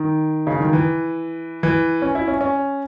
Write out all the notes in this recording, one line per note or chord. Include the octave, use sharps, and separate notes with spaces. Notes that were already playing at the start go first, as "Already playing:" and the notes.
Already playing: D#3
C#3
D#3
E3
E3
C#4
E4
C#4
C#4